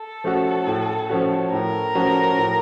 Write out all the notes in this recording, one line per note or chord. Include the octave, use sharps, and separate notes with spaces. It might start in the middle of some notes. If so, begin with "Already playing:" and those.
Already playing: A4
F3 A3 C#4 F#4
A2
F3 A3 C#4 F#4
A2 A#4
F3 A3 C#4 F#4
A2